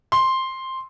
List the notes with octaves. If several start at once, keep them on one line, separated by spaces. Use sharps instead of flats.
C6